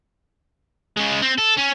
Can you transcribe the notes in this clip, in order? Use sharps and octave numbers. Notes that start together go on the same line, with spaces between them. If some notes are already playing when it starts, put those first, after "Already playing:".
C#3 G#3
C4
A4
C#4